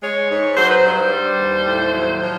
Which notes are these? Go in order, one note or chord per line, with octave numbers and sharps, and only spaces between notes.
G#3 C#5
G#2
F#3 C5
B4
C5
G2
G3
D#2
A2
F#3
F3